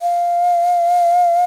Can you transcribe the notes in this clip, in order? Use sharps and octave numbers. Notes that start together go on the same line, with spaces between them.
F5